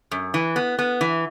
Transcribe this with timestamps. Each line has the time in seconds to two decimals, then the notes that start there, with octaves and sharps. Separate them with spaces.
0.11 F#2
0.34 E3
0.56 B3
0.79 B3
1.01 E3